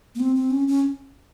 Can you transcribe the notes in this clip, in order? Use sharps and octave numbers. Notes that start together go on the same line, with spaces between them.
A#3
C4
C4
C#4
C#4